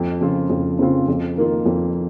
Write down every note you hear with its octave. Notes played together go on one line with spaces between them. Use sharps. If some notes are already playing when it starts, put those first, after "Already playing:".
Already playing: F2
C#3 F3 C4 F4
F2
C#3 F3 C4 F4
F2
D#3 A#3 F4
F2